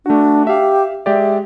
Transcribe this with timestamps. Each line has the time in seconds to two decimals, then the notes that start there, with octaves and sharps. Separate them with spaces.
0.06 A3 D4 F#4
0.47 G4 E5 F5
1.06 G#3 G4 D5 E5